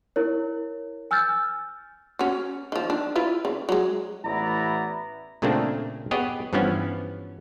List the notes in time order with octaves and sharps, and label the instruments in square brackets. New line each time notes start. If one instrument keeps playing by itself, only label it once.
[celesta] E4 A#4 C#5
G#5 E6 F6 G6 A6
[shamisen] C#4 F#4
D#3 F3
D4
E4 F4 B4
C#3
F#3 G#3
[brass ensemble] A1 B3 E4 D5 E5 A#5
[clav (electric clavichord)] A#2 C#3 A3 A#3 C4 D4
B3 G4 G#4 C#5 D#5
G2 E3 F3 B3 C#4